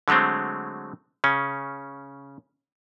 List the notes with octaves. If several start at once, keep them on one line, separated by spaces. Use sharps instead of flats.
D3 F#3 G#3 A3 C4
C#3 C#4